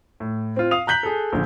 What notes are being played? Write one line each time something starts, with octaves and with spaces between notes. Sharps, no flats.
A2
C4 F4
F5 D#6 F7
A#5 F#6 G6 B6 F#7
G#4 A4
A#1 D3